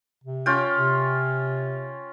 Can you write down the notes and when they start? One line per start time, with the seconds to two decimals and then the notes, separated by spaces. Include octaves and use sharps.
0.24 C3
0.46 C#4 F4 G5
0.76 C3